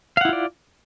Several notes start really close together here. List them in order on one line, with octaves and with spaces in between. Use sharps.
F5 F#5 E4 F4 D5